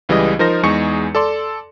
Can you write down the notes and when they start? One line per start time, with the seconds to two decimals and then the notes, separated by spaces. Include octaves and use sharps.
0.09 C#2 E3 G3 G#3 D#5
0.39 F3 D#4 A#4 C5 A#6
0.63 E2 G#3 D#4 G#4 C#6 C#7
1.15 A4 D5 C6